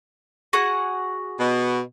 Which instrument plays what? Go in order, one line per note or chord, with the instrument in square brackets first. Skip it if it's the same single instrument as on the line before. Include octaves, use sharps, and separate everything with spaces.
[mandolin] F#4 G#4 F#5
[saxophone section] B2